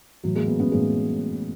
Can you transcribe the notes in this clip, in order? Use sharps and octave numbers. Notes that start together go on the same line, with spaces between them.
A2 E3 F#3
G#3 A#3
A3 B3
B3 C#4
A2 E3 G#3 A#3